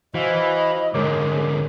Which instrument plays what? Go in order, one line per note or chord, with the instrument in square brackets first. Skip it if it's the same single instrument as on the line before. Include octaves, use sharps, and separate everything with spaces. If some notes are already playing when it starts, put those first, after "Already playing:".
[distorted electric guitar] E3 [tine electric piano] F#4 C5 F5 [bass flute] D#5
[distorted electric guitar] D2 G#2 [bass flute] G#3 [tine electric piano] A#4 C#5 D6